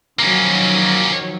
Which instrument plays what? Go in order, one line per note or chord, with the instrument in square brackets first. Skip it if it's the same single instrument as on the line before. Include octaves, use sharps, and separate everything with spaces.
[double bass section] D#3 F3 F#3 [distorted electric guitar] A#3 C#4